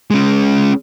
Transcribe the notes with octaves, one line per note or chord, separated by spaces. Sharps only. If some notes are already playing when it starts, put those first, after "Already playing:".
G#3 C#4